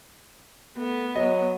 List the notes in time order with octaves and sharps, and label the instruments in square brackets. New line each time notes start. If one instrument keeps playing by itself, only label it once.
[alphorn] A3 [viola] B3
[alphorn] F#3 [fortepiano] D#5